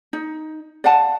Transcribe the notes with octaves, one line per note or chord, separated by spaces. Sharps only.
D#4
D5 F5 F#5 A5